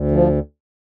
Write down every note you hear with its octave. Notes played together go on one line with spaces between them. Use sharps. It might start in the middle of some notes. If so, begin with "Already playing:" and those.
Already playing: D2
F3